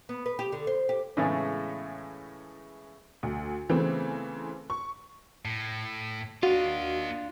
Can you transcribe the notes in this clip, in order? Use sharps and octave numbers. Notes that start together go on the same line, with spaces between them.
B3
B4
G4
D3
C5
G4
A2 C#3 E3 G#3 A3 B3
D2
C#3 E3 A3 B3 C4
C#6
A2
A#3 D4 F4 F#4 D#5